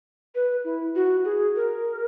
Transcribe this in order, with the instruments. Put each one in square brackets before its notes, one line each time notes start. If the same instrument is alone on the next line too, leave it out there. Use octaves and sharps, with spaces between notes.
[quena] B4
E4
F#4
G#4
A#4